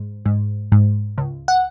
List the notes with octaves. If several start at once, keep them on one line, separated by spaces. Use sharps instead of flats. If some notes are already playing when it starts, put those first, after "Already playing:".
Already playing: G#2
G#2
G#2
C#2
F#5